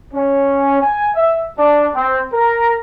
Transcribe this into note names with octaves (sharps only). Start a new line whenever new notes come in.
C#4
G#5
E5
D4
C4
A#4